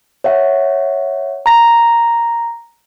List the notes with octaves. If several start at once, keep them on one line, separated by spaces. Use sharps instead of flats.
C#5 E5 F#5
A#5 A#6